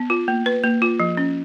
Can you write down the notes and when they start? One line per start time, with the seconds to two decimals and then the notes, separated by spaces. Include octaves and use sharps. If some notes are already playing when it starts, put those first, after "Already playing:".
Already playing: B3
0.10 F4
0.28 A#3
0.46 B4
0.64 A#3
0.82 F4
1.00 F3
1.17 C#4